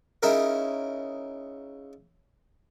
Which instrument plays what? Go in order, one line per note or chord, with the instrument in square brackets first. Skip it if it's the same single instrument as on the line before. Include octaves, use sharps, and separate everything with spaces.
[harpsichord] C#3 D#4 E4 A#4